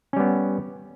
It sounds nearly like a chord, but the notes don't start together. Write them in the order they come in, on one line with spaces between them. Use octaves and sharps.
C#4 G3 B3